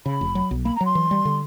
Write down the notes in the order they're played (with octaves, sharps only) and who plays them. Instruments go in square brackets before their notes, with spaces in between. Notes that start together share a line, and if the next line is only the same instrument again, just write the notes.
[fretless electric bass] C#3 [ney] B5
[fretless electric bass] F1
F#3
B1
[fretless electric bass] A#3 [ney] B5
[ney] A#5
[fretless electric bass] F#3 [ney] C6
[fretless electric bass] E3
G3
D3